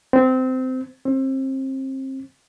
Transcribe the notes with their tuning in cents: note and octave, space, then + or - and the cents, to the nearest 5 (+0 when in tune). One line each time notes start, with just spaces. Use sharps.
C4 -20
C4 +30